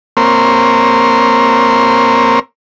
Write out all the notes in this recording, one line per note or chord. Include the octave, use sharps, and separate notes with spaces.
A#3 C4 A#4 C#5 C6